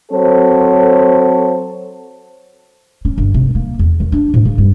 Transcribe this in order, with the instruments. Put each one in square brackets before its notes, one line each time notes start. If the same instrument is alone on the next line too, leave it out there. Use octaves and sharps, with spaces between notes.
[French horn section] F#3 C4 A4 C5 C#5
[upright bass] C#4
G1
C3
A#3
E2
D#3
D4
A2
C#3
G2